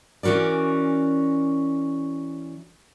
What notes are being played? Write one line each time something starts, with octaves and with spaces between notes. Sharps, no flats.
E3 C#4 F#4 A#4 D5